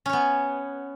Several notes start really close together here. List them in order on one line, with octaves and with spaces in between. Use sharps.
C#4 C#5 B3